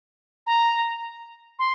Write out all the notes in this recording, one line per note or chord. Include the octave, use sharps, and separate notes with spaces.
A#5
C6